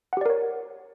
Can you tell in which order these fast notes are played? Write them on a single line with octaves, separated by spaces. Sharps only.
F#5 G4 D5 A#4 C#5